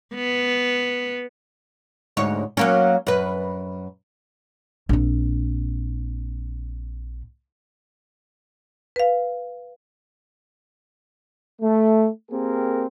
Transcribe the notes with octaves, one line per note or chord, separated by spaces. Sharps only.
B3
D2 G#2 C#5
F#3 A#3 C#4
F#2 B4
A#1 C4
B4 F5
A3
A#3 C4 G4 G#4 A#4